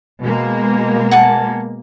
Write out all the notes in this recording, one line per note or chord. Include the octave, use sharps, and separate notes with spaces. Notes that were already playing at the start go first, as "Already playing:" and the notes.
B2 G#3 A#3
F#5 G#5 A5